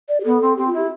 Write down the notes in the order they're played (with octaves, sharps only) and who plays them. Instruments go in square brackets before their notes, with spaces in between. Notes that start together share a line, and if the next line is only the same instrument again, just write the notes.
[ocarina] D5
G4
[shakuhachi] B3 [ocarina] A4
[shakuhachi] C4
[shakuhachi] C4 [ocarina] G4
[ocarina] F4
[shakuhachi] E4
[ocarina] G4